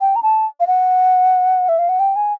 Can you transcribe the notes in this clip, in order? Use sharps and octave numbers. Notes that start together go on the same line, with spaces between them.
G5
A#5
A5
F5
F#5
E5
F5
F#5
G5
G#5